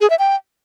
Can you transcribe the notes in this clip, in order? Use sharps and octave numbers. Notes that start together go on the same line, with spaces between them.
G#4
E5
G5